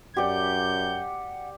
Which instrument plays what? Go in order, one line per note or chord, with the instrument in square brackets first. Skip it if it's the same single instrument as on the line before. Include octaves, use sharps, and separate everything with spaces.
[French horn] F#2 [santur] G4 D5 [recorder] F#5 [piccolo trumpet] G6